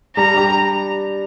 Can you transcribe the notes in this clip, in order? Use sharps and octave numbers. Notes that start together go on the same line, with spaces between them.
G3 A#5
D4 G4